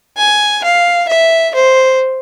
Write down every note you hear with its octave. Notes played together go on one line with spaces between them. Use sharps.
G#5
F5
E5
C5